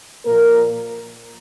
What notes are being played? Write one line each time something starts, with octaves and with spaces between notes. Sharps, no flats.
A#2 F3 A#3 A#4